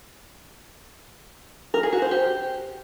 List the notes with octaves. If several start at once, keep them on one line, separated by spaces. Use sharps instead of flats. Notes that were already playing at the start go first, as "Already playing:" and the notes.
A#4
G#4
F#4
C5
G4